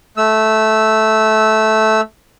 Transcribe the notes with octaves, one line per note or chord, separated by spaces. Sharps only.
A3 E6